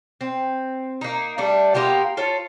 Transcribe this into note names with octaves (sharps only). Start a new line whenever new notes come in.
C4
A#3 D#4
G3 A3 D4
A#3 B3 F4 G4
F4 A4 C#5